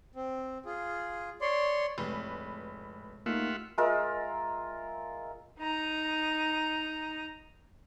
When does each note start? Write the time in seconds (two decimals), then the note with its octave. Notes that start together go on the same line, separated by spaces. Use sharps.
0.15 C4
0.65 F4 G#4
1.41 C#5 D5 C6
1.98 F1 A2 G#3 B4
3.26 A3 A#3 D#4 F4 G4 E5 F#5
3.78 G#3 F4 A#4 E5
5.59 D#4 A#5